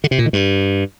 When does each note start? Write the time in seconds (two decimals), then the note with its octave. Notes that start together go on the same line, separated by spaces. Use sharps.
0.04 D3
0.11 C3
0.18 A#2
0.26 D#3
0.33 G2